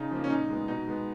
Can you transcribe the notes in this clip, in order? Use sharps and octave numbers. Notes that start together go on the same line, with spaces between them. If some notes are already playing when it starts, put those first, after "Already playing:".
Already playing: C#3 D#4
F3 A#3
C#4
A#2 D#4
G#3 B3
B2 D#4
G#3 B3